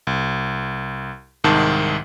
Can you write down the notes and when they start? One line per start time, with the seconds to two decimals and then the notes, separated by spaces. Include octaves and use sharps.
0.07 C2
1.44 C2 G#2 D#3 A5